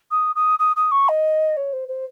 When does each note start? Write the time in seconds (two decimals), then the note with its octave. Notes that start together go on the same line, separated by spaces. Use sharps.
0.11 D#6
0.35 D#6
0.59 D#6
0.76 D#6
0.91 C#6
1.08 D#5
1.57 C#5
1.73 C5
1.88 C5